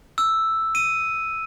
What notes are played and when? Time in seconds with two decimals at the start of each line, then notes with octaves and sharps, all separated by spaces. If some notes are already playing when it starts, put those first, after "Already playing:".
0.18 E6
0.75 D#7